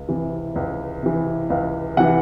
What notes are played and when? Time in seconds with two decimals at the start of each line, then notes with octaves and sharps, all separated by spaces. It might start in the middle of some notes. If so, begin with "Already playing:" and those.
Already playing: C#2
0.09 C3 E3
0.56 C#2
1.03 C3 E3
1.50 C#2 F5
1.97 C3 E3 F#5